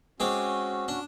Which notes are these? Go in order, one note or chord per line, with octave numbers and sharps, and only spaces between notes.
G#3 C4 C#4 F#4 D6
D4